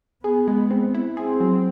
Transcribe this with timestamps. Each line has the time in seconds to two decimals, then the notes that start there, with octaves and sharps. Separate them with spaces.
0.24 B3 G#4
0.48 G#3
0.71 C4
0.94 E4
1.17 C4 G#4
1.40 F#3